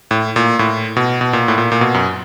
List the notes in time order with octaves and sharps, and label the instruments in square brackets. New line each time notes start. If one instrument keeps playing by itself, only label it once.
[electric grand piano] A2
A#2
A2
B2
B2
A#2
A2
A#2
A#2
B2
F#2